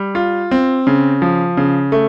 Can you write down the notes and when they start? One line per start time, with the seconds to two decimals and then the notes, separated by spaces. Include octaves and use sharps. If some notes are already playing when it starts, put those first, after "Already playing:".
Already playing: G3
0.15 F4
0.51 C4
0.87 C#3
1.22 F3
1.57 C#3
1.92 A3